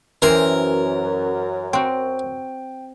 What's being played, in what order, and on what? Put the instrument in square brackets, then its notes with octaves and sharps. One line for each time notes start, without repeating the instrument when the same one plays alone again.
[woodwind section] F#2 [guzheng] E3 C5 G5 [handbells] C#4 [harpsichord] A#4
[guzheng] C4 F#4 [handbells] G5